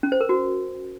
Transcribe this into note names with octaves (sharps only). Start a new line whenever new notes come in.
C#4
C5
A#4
F#4